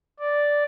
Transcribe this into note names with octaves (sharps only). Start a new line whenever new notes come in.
D5